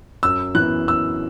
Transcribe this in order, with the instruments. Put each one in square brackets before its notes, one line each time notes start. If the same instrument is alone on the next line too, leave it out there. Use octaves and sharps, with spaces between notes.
[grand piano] F#2 E6
E3 B3 F#6
F#2 E6